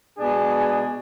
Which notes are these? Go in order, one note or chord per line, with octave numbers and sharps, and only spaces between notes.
B2 G#3 D4 G#4